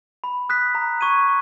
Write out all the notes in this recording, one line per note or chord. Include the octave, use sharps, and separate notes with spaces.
B5
D#6 F#6 B6
A#5
C#6 G#6 D#7